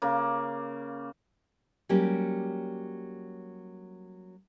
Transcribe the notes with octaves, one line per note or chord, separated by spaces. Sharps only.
C#3 A#3
F#3 G3 A#3 C#4 G4